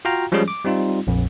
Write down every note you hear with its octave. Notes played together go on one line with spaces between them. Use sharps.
F4 F#4 F5 G5 A#5
F3 G3 G#3 C#4 G#4
D6
G3 C4 D#4 F4
A#1 F2